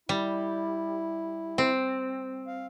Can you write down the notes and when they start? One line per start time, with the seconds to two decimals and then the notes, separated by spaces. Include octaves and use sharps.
0.09 G3 E4
1.58 C4
2.47 F5